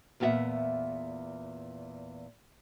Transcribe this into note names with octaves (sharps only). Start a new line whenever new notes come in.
E2 A#2 B3 F#4 E5 F#5